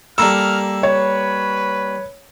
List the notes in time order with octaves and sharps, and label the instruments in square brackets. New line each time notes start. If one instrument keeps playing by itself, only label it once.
[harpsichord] G3 A#3 A4 [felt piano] A#5 E6 [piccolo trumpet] F6
[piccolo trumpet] B4 [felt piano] C#5